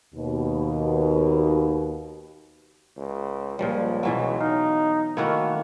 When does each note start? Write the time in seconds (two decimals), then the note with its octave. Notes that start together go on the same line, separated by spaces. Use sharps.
0.15 D#2 B2
2.97 C#2
3.59 C#2 A#2 F3 G3
4.03 B2 E3 F#3
4.41 D#4 F5
5.17 D#3 A3 A#3 E4 F#4 C#5